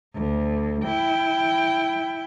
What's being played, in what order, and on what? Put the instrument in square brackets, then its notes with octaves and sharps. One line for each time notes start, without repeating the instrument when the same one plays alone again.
[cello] D2
E4 G5